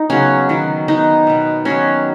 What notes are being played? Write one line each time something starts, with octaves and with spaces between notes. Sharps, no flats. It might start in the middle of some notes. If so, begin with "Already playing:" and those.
Already playing: D#4
C#3 F#3 B3 C#4
D#3 F#3 B3
D#3 B3 D#4
B2 B3
D#3 F#3 B3 C#4 F#4